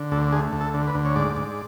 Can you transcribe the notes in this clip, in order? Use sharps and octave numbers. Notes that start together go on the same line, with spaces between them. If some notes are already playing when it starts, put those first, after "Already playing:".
Already playing: D3
D2 A4
A3 G#4
D2
A4
D3
B4
D2
C#5
G#2 D5
G#2